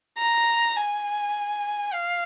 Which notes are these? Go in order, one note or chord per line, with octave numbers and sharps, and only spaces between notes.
A#5
G#5
F5